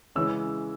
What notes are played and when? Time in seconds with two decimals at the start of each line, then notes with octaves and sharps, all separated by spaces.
0.15 C#3 E3 G#3 C#4 E6